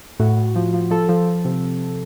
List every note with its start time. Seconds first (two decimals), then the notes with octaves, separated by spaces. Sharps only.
0.20 A2 F#4
0.37 A2
0.56 F3
0.74 F3
0.91 F3 A4
1.09 F3
1.27 F3
1.45 C3